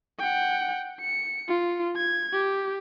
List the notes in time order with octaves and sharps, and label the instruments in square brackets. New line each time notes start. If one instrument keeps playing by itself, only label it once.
[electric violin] F#5 G5
C#7
F4
G#6
G4